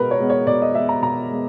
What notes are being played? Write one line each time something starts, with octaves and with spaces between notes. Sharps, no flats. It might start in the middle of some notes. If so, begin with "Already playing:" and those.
Already playing: B2 G#3 B3 A#4 B4
C#5
G#3 B3
C#5
B2 D5
D#5
G#3 B3 E5
A#5
B2 A#5
G#3 B3